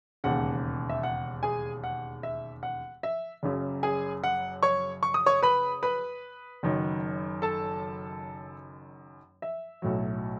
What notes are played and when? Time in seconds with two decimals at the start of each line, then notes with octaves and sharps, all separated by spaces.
0.24 E1 D#2 C#3 F#5
0.89 E5
1.03 F#5
1.43 G#4 G#5
1.84 F#5
2.23 E5
2.63 F#5
3.03 E5
3.43 F#1 F#2 C#3
3.83 G#4 G#5
4.24 F#5
4.63 C#5 C#6
5.03 C#6
5.14 D#6
5.26 C#5 C#6
5.43 B4 B5
5.83 B4 B5
6.63 F#1 F#2 D#3
7.42 A4 A5
9.42 E5
9.82 B1 A2 F#3